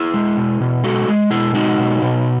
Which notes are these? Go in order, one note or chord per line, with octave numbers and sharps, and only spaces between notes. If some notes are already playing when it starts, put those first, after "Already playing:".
Already playing: E4 G#4
G#3
B2
B2
G#3 F#4 A4
G#3
B2 E4 G#4
G#3 D#4 F#4
B2
B2